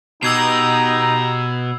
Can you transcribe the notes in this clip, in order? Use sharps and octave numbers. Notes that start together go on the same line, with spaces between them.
B2 D#4 G4 A#5 E6 G#6 C7